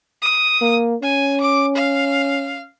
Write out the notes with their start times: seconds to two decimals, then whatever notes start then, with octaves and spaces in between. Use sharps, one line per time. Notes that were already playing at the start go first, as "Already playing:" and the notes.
0.22 D#6
0.61 A#3
1.03 C#4 G#5
1.40 D6
1.75 F5